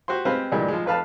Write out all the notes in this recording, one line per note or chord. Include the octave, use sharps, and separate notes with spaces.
F#4 G4 C5 C6
G#3 C4 G4 B4 C5 F5
D2 A#2 E3 G3 G#3
F3 G#3
F2 B4 F5 A5